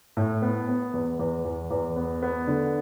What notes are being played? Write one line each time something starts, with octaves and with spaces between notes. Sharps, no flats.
A2
B3
B3
E2
E2
E2
E2
B3
B3
D3